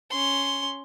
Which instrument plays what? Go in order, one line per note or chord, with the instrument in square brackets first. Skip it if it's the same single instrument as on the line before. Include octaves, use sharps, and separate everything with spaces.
[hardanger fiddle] C#4 C6